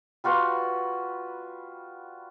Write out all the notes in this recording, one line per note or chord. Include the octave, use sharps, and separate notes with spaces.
G3 F4 F#4 B4